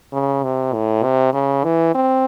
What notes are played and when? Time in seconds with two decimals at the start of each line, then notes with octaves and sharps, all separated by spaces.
0.13 C#3
0.43 C3
0.73 A2
1.04 C3
1.33 C#3
1.64 E3
1.95 C4